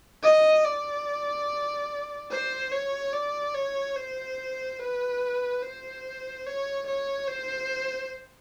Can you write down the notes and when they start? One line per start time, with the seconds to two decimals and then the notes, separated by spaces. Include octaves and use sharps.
0.23 D#5
0.64 D5
2.31 C5
2.72 C#5
3.13 D5
3.55 C#5
3.96 C5
4.80 B4
5.62 C5
6.46 C#5
6.87 C#5
7.28 C5